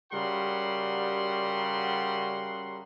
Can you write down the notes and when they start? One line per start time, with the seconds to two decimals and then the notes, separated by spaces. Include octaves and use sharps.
0.12 C#3 G3 F#4 A#4 F#5 C6